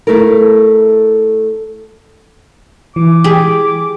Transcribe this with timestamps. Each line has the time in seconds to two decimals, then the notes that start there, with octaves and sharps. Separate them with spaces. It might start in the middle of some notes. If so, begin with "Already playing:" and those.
0.07 A3 E4 A4 A#4
2.96 E3 D6
3.24 G4 G#4